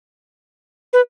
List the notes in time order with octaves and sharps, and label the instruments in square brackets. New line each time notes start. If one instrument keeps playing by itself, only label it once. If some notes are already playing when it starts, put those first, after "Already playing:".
[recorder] B4